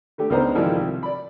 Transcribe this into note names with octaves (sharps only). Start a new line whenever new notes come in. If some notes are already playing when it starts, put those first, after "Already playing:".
D3 A3 G4
C#2 B3 D4 D#4 C5 A#5
G#2 D#3 F3 G3 D#4 E4
C2
D5 B5